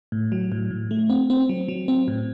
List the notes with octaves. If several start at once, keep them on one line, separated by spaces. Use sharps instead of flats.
A2
F#3
A2
A2
A3
C4
C4
F#3
F#3
C4
A2